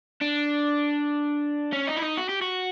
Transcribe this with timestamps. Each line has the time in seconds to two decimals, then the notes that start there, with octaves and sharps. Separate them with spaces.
0.22 D4
1.73 C#4
1.87 D#4
1.97 E4
2.02 D#4
2.18 F#4
2.29 G4
2.42 F#4